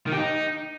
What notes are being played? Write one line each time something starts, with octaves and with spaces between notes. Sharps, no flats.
D#3
G4
D#4